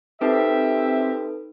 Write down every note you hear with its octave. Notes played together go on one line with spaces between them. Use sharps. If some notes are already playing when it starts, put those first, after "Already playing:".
C4 D#4 G4 A4 B4 E5